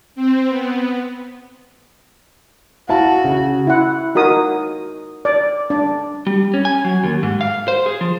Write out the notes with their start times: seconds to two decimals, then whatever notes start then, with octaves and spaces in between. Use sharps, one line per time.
0.15 C4
0.49 B3
2.89 E4 F#4 F5 A5
3.24 C#3
3.67 E4 F#5
4.15 D#4 F#4 A#4 D#6
5.25 D5
5.70 D4 D5
6.27 G3
6.54 C#4
6.65 G#5
6.84 F#3
7.04 D#2
7.23 G#2
7.41 F5
7.68 C5
7.86 G#4
8.01 F3